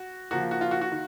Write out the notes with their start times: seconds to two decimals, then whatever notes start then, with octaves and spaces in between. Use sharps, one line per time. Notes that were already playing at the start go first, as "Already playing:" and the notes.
Already playing: F#4
0.31 C#3 F3 A#3 F#4
0.51 F#4
0.61 F4
0.71 F#4
0.81 F#4
0.91 D#3